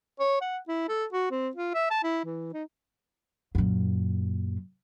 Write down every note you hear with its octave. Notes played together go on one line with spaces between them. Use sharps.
C#5
F#5
E4
A4
F#4
C4
F4
E5
A5
E4
E3
D#4
F#2 A#2